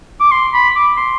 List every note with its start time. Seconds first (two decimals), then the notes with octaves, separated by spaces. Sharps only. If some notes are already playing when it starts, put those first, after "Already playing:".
0.20 D6
0.31 C6
0.53 B5
0.75 D6
0.97 C6